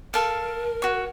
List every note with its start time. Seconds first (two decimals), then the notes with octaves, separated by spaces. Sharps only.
0.14 A4 A#4 F5
0.82 F#4 C#5